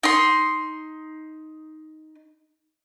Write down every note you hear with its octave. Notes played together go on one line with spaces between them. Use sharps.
D#4 C6